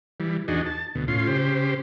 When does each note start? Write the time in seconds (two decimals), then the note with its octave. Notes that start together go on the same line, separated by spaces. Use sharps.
0.20 E3 G3
0.48 E2 D4 D#4 F#4 G#4
0.66 A5
0.95 D2 B2
1.08 A2 C#4 F4 C6
1.27 C#3 G4 C5